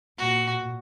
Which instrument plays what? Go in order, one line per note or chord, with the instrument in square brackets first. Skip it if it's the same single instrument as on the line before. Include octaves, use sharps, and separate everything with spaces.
[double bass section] A#2 [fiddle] F#4